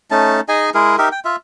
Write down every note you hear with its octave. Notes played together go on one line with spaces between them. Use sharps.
A3 C#4 D#4 A5
D#4 G#4 D#5 G#5
G#3 E4 G#4 A#4
D#4 G4 A#4 E5
G5
F4 E5